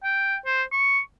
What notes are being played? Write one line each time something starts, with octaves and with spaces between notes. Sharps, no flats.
G5
C5
C#6